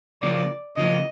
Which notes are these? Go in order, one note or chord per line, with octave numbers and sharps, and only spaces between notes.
C#3 F3 A#3 D5
C#3 F3 A#3 D#5